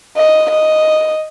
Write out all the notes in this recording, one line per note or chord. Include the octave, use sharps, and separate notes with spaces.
D#5
D#5